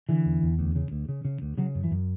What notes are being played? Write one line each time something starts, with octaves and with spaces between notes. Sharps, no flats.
D3 E3
E2
E2
D2
C#3
D2
C#3
C#3
D2
C#3 F#3
F#2
E3
F#2